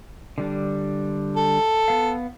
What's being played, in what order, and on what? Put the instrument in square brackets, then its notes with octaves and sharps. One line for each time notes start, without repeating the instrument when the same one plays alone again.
[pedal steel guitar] D3 G3 D4
[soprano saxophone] A4
[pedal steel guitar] B3 F5